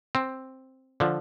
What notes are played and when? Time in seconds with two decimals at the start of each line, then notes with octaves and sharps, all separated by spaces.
0.15 C4
1.00 D3 F3